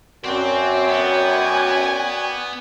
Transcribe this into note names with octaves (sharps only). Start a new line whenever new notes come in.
F#2 C4 F#4 D5 G5
B3 G#5